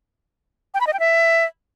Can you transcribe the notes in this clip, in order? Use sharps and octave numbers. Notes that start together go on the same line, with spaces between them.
G5
B5
D#5
G5
E5